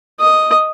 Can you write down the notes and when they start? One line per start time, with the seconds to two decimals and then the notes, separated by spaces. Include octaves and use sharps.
0.20 D#5